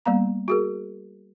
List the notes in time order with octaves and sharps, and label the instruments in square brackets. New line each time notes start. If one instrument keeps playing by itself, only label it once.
[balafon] G3 A#3 B3 A#5
F#4 G#4 A#4